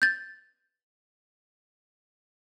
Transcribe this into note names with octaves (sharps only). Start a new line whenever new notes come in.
G6 A6